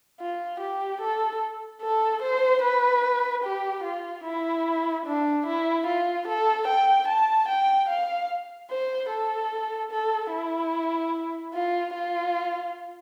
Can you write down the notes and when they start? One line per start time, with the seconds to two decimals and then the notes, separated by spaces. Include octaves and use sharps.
0.20 F4
0.60 G4
1.01 A4
1.82 A4
2.22 C5
2.62 B4
3.44 G4
3.83 F4
4.24 E4
5.06 D4
5.46 E4
5.86 F4
6.27 A4
6.67 G5
7.08 A5
7.48 G5
7.89 F5
8.70 C5
9.10 A4
9.91 A4
10.31 E4
11.54 F4
11.93 F4